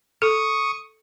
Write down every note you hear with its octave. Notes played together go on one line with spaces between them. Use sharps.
A4 C#6 D#6